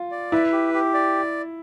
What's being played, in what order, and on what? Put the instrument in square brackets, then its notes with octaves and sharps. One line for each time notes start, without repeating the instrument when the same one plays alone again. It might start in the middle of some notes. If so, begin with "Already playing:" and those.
Already playing: [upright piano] F4
[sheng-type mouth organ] D5
[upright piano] E4 [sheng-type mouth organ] B4
[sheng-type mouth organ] G4
G4
D5